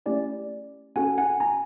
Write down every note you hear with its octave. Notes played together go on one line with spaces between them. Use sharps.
A3 C#4 E4 G4 D5
C#4 F#4 A4 F#5 G#5
F#5 G#5
G#5 A#5